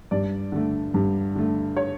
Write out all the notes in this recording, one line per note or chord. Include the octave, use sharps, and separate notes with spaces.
G2 D5
D3 A3
G2
D3 A3
C#5